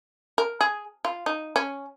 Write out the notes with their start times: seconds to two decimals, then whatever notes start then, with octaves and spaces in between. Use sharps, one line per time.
0.38 A#4
0.61 G#4
1.05 F4
1.26 D#4
1.56 C#4